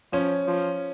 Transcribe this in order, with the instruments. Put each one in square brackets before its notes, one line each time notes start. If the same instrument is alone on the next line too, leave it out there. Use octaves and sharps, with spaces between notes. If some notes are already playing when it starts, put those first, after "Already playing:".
[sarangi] F3 [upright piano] C#4
[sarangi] F3